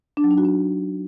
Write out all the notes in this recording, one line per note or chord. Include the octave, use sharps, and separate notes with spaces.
D4
F#3
D#4
F#4
D4